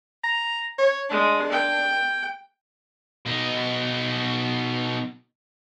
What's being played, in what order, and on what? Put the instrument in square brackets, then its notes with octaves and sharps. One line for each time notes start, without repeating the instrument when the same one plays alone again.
[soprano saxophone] A#5
C#5
[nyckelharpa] G#3 [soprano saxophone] D4
[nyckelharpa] G5
[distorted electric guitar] B2 D#4